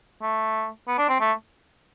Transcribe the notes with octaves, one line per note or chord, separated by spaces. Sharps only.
A3
B3
D4
C4
A3